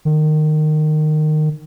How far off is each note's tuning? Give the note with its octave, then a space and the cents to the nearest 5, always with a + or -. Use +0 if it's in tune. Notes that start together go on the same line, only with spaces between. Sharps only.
D#3 -20